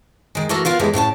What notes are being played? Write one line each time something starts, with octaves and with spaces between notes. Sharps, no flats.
D#3 G#3
E3 A3 F#4 A4 A#4
B3 F4 A#4 F5
A2 E3 G#3 B3 E4 G4
A2 C#3 C5 A5